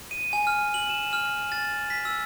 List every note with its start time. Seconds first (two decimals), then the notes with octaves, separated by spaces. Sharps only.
0.11 D#7
0.33 G#5
0.47 F6
0.74 F#7
0.90 E7
1.13 F6
1.52 A6
1.90 B6
2.05 E6